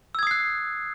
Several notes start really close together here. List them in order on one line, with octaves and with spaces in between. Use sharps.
E6 G#6 D#6 C7 F#6